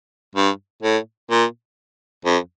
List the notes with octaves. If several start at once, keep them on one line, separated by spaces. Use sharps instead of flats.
G2
A2
A#2
F2